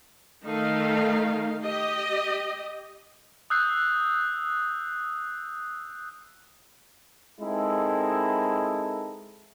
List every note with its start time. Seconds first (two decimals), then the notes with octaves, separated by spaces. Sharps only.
0.45 D#3 A3 D#4 F5
1.63 G4 D#5
3.50 D#6 E6 F#6 G6 C7
7.40 G#3 C4 D#4 E4 A4 A#4